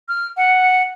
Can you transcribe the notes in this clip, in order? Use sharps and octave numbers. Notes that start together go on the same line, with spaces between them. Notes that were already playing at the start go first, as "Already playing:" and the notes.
F6
F#5